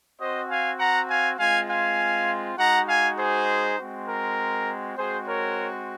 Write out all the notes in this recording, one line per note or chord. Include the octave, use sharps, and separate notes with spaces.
C4 F#4 C5 D#5
F5 G#5
F#5 A#5
F5 G#5
G#3 C4 F4 F5 G#5
F5 G#5
G#3 D#4 F#4 F#5 A#5
F5 G#5
G#4 C5
G#3 C4 F#4
A#4
G#3 C4 F#4 G#4 C5
A#4 C#5